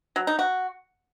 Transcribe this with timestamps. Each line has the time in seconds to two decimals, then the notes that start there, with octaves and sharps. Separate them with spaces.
0.16 F#3
0.27 D#4
0.39 F#4